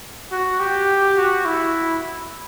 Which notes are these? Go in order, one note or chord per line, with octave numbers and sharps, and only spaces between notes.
F#4
G4
F#4
E4